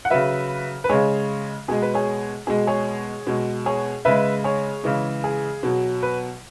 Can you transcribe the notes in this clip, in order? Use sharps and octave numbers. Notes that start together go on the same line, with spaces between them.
F#5
C#3 F#3 B4 E5
B4
C#3 G#3 G#4 C#5
B2 G#3 G#4
B4
G#4 C#5
B2 G#3 G#4
G#4 C#5
B2 G#3
G#4 C#5
C#3 G#3 B4 E5
G#4 C#5
C#3 E3 G#3
G#4
B2 F#3
B4